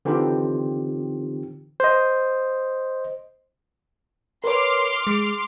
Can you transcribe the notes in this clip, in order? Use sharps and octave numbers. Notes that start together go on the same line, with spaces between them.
D3 E3 C4 D#4 F4 G4
C5 D#5
A#4 B4 C#5 C6 D6 F6
G#3